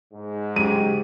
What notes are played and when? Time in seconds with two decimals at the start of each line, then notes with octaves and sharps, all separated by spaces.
0.13 G#2
0.56 C#3 F#3 G#3 G4 D#7